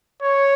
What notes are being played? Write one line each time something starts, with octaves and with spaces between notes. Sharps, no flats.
C#5